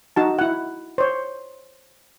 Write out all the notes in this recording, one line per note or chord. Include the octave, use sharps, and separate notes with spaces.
D#4 F#4 A5
E4 F#5
C5 C#5